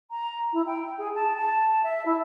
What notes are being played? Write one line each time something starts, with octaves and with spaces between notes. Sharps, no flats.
A#5
E4
G5
G#4
A5
A5
E5
E4